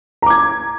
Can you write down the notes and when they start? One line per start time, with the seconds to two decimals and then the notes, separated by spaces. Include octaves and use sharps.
0.22 A#5
0.26 D6
0.30 G#6